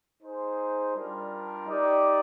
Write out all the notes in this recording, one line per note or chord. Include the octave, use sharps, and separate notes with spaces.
D#4 G#4 C5
G3 D4 F4 A#4
D#4 G4 D5